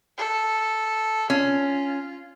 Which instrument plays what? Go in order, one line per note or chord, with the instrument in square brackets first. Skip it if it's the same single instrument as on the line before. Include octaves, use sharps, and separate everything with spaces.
[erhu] A4
[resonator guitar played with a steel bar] C#4 [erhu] F4